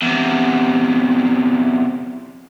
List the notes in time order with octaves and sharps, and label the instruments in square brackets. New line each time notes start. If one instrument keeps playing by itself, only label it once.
[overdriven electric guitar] E2 C3